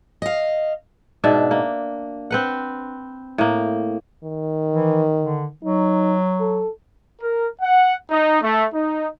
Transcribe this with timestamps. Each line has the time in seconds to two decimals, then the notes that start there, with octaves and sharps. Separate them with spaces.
0.22 D#5 F5
1.24 G#2 B2 D4 E5
1.51 A#3
2.31 C4 B4 F#5
3.38 A2 A#3
4.24 D#3
4.73 E3
5.19 D3
5.63 F#3 D#4
6.40 A4
7.21 A#4
7.62 F#5
8.11 D#4
8.43 A3
8.75 D#4